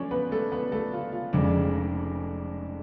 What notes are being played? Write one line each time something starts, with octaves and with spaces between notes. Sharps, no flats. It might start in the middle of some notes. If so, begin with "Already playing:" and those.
Already playing: F#2 F3 A3 C#4 D4 C#5
B3 B4
A3 A4
B3 B4
A3 A4
F4
F4
F1 F2 C#3 G#3 D4